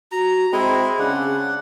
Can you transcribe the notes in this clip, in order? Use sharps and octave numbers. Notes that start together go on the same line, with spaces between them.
F#4 A#5
G#3 C4 E4 G#4
C#3 D4 F#5